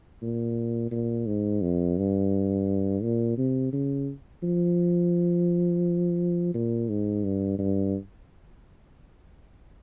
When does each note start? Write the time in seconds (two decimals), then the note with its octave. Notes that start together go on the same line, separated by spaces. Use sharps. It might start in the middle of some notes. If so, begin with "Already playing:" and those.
0.22 A#2
0.91 A#2
1.27 G#2
1.62 F2
1.97 G2
3.03 A#2
3.37 C3
3.73 C#3
4.43 F3
6.54 A#2
6.89 G#2
7.24 G2
7.59 G2